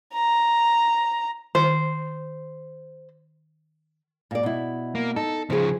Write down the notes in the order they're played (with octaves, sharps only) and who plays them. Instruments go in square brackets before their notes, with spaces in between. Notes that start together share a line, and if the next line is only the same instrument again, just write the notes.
[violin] A#5
[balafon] D#3 [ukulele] C5
[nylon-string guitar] A#2 D5
B2 E4
[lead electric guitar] A#3
[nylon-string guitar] D#4 [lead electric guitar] A4
[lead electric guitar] C#3 F3 [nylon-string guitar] G#4 C5